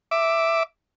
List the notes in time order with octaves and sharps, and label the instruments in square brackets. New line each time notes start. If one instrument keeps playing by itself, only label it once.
[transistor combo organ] E5 D6